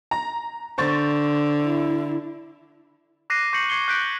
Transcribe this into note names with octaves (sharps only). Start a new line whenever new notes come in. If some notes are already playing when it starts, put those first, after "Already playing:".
A#5
D3 C5 C#6 A6
E4
D6 F#6 A#6 C7 D#7
C#6 G6 A#6 C7 C#7 F#7
C#6 D6 G#6 C7 C#7 G7
F#6 G6 B6 C#7 D7 G7